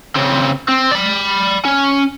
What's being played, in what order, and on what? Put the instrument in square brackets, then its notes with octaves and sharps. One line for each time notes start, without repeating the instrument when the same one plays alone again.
[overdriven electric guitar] C#3 C4
C4
D5 B5
C#4